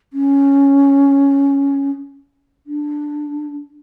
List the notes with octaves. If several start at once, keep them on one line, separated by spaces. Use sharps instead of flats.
C#4
D4